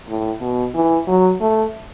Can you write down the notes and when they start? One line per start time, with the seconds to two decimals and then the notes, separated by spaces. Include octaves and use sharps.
0.09 A2
0.41 B2
0.75 E3
1.07 F#3
1.41 A3